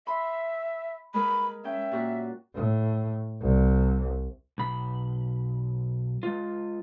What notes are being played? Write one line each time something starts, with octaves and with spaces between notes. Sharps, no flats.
E5 B5 C6
G#3 A#4 B5
C#4 E5 G5
A#2 F#4 F#6
A2
C2
B1 B5
G#3 F4